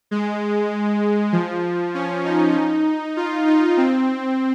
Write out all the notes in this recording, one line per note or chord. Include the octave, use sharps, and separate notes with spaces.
G#3
F3
C#4
D#4
F4
D#4
C4